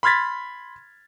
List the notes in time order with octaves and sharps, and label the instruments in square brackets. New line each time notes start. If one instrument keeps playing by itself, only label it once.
[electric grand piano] B5 C6 F6 G#6 A6 B6